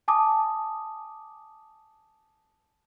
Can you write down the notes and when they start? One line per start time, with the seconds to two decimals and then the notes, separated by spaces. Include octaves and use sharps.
0.08 G#5 A5 D6 D#6